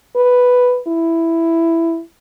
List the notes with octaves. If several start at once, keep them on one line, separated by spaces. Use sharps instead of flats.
B4
E4